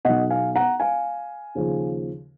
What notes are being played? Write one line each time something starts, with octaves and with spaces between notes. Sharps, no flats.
B1 B2 D#5 F#5
F5 G#5
F#5 A#5
F5 G#5
D#2 C#3 F3